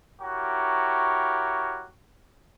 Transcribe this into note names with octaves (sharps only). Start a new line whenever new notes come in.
E4 F#4 G4 A#4 C#5